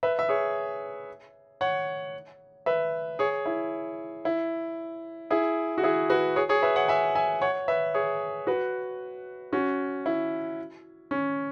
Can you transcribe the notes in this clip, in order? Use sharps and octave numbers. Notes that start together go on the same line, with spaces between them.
B4 E5
E5
G#4 C#5
C#5 F#5
B4 E5
G#4 C#5
E4
E4
E4 G#4
F#4
E4 G#4
F#4 B4
G#4 C#5
G#4 C#5
B4 E5
C#5 F#5
E5 G#5
E5 G#5
C#5 F#5
B4 E5
G#4 C#5
F#4 B4
C#4 F#4
E4
C#4